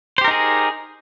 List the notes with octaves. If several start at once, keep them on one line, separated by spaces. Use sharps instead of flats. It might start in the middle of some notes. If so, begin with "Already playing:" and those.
D#4 G4 G#4 A#4 C5